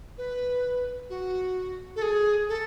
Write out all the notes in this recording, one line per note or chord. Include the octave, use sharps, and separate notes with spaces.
B4
F#4
A4
G#4
A4